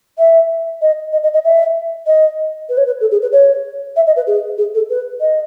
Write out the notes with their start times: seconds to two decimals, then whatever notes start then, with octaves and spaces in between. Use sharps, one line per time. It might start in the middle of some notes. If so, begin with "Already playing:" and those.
0.18 E5
0.81 D#5
1.12 D#5
1.23 D#5
1.33 D#5
1.44 E5
2.06 D#5
2.69 B4
2.77 C#5
2.86 B4
3.00 A4
3.11 G#4
3.22 B4
3.32 C#5
3.96 E5
4.06 D#5
4.16 B4
4.27 G#4
4.58 G#4
4.74 A4
4.90 B4
5.20 D#5